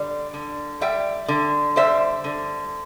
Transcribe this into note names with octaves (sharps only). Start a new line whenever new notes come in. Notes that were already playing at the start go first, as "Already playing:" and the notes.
Already playing: D3 G3
D3
G3 E5 G5
D3
G3 C5 E5
D3